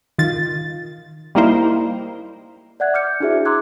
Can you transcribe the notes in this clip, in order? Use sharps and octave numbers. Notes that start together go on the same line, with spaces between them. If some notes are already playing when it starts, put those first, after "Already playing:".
D#3 F4 A6
G3 A#3 D#4 E4 A#4 C5
D5 E5 F#5 F#6 G#6
D6 F6 G6 C#7
D4 E4 F#4 G#4 C5 E5
A#5 C6 D6 E6 F#6 G#6